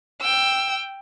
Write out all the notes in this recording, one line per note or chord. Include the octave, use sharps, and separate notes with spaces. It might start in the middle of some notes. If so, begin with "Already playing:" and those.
G5 E6